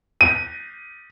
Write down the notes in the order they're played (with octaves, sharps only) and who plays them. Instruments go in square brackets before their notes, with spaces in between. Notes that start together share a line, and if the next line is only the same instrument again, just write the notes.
[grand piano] D#7